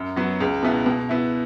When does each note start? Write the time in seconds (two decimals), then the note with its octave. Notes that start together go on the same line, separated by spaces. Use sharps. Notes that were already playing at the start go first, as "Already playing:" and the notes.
Already playing: F#2
0.16 F#3 B3
0.40 C#2
0.63 B2 B3 E4
0.86 B2
1.09 B3 E4